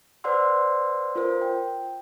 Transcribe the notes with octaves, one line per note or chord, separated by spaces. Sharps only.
B4 C5 D5 F#5 C6 E6
F4 A#4 C5
G5